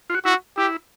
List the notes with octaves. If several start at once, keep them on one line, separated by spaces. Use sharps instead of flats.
F4
F#4
E4 F#4
E4 G4